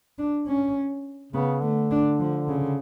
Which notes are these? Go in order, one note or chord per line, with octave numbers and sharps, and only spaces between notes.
D4
C#4
C#3 B3
D3 A3
D4
F3
C#3